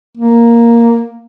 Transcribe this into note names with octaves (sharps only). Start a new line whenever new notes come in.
A#3